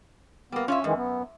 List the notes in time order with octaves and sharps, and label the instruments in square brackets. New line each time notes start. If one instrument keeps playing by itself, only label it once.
[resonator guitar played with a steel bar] G3 A#3 [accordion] B3
[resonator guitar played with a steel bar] C#4 D5 E5 [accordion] F4
[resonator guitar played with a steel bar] F#2 [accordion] D#3 E3 G#3
[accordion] B3